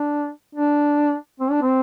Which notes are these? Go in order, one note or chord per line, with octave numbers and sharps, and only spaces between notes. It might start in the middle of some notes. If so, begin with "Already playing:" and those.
Already playing: D4
D4
C4
D4
C4